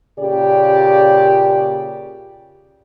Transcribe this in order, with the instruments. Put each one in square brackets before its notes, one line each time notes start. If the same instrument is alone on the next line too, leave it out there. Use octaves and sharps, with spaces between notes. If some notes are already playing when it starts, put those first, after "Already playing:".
[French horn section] A#2 C#3 G4 D5